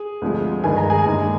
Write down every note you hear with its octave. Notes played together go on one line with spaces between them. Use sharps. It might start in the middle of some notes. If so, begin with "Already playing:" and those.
Already playing: G#4
D2 C3 F3 G#3
G2 D#3 G#3 G#5
A#5
G#4 G#5
D#2 D#3 G#3